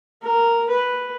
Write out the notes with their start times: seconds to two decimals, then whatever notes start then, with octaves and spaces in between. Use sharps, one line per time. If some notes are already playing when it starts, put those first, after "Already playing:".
0.23 A#4
0.70 B4